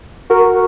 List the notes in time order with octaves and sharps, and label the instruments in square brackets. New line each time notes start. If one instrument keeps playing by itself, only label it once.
[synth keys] F#4 A#4